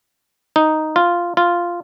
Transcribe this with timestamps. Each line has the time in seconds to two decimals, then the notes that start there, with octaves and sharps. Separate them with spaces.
0.56 D#4
0.96 F4
1.37 F4